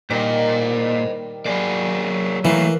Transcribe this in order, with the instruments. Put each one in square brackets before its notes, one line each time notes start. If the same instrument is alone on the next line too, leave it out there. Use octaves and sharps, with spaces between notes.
[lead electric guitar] A#2 [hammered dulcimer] D#3 G3 [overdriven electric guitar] C5 D#5
[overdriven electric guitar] F#3 D5 [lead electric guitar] A#3 G#4
[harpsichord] E3 [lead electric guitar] A3 A#3 [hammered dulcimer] A#4 B4 F5